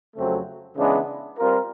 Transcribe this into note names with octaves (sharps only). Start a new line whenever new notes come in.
F2 C#3 F#3 A3 C4
C#3 E3 G#3 B3 D4
G3 C4 F4 A#4